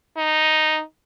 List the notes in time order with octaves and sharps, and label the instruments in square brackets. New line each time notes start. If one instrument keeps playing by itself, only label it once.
[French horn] D#4